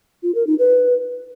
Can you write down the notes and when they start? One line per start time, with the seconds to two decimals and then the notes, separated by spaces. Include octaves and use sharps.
0.23 F4
0.35 A#4
0.47 D#4
0.59 B4